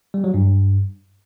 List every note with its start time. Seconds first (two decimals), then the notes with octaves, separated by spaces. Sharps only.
0.14 G3
0.24 F#3
0.34 G2